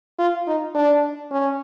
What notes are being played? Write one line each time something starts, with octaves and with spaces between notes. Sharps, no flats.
F4
D#4
D4
C#4